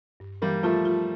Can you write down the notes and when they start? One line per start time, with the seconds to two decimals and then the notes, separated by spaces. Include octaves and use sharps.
0.20 G2
0.42 E3 G3 A#3
0.63 F3 A3 F4
0.85 F4